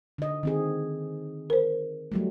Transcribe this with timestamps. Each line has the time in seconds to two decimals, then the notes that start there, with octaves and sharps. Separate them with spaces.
0.18 D3 D#5
0.43 D#3 C4 G#4
1.50 A#4 C5
2.12 F#3 G3 A3